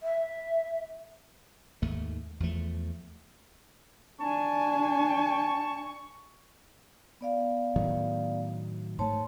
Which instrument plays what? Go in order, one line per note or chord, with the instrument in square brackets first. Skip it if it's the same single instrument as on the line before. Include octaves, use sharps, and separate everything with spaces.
[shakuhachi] E5
[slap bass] D#2 G#2 A3
E2 F3 A3
[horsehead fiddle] D4 G#5 [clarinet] A5 [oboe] C#6
[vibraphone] B3 D5 F5
[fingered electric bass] A2 D#3 F#3
[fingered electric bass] G#2 A3 [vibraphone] C#5 A5 C6